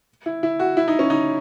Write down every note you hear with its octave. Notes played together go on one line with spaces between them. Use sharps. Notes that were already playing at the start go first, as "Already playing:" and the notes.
E4
E4
F#4
E4
D#4
C#4
D#4